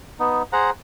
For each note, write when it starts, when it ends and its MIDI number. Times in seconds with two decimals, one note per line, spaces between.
0.20 0.42 59
0.20 0.42 63
0.53 0.70 68
0.53 0.70 72
0.53 0.70 78
0.53 0.70 82